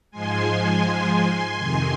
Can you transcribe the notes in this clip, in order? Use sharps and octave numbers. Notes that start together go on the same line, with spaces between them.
G#2 F3 G#3 G#5 C6
F2 C3 D#3